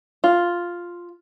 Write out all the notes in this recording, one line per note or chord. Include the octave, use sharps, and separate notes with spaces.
F4